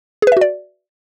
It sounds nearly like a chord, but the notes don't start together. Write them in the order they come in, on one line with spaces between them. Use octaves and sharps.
G#4 B4 E5 F#4 D5